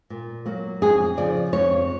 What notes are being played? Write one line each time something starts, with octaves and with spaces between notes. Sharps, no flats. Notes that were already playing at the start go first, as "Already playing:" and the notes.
A#2
F#3 A#3
F2 G#4
C#3 F3 D5
F2 C#5